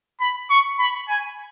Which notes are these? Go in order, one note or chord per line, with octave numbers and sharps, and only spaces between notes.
B5
C#6
B5
G#5